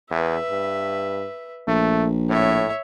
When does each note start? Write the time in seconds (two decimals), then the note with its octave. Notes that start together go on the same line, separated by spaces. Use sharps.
0.11 E2 B4 E5
0.50 G2
1.67 A#1 A3
2.29 A2 C#5 E5